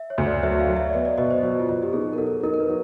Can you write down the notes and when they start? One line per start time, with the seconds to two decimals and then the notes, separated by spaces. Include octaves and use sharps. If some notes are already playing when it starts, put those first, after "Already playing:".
Already playing: E5
0.10 C#5
0.18 D2
0.27 D5
0.43 F#3 E5
0.60 F5
0.69 F#3
0.76 E5
0.89 D5
0.93 B3 D#5
1.05 D5
1.18 B2 D#5
1.31 C5
1.43 F#3 F#4
1.60 F4
1.69 B2
1.82 G4
1.93 D#4 G#4
2.13 A#4
2.18 F#3 A4
2.43 D#4 A#4
2.54 A#4
2.60 B4
2.68 F#3